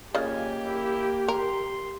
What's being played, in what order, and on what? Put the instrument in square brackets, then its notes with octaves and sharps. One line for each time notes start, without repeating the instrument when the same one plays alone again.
[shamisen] C#3 F4 D#5 [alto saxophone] A#3 [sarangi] G4 [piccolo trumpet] G#5
[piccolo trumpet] E4
[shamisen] A#4 [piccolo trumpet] C6